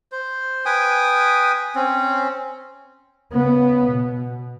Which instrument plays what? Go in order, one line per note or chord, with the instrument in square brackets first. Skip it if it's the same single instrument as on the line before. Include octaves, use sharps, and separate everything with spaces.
[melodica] C5
B4 G5 G#5 D#6
C4 C#4
[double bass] C#3 B3
B2